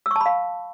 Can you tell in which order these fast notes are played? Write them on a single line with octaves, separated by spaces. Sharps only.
E6 C#6 A5 B5 F5